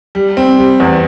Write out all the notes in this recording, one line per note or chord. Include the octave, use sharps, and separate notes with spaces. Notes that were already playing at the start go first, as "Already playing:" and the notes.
G3
C4
G3
E2